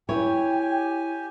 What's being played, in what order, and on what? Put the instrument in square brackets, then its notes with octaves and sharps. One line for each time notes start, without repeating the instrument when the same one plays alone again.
[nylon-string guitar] E4 [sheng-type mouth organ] G4 G#5 [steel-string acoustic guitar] C#5 [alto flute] G5